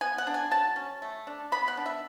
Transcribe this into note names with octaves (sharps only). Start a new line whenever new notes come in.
B3 G#5
F#5
D4
G#5
F#3 A5
C#4
A3
D4
B3 B5
F#5
D4
E5